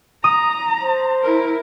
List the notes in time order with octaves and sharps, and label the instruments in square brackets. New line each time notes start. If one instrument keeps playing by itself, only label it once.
[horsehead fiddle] A#5 [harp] D#6
[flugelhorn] C5
[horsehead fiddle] E4 A#4